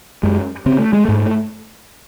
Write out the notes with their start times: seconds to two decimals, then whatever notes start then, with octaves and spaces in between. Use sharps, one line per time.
0.23 F#2 G#3
0.66 C#3 C4
0.79 A3
0.93 G#3
1.05 G#2 A3